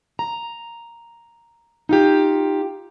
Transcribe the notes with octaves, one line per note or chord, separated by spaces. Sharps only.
A#5
D#4 F4 G4